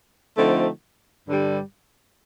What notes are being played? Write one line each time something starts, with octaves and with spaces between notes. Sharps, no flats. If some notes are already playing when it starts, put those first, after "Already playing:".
D3 F3 A3 C4 D#4
G2 D3 G3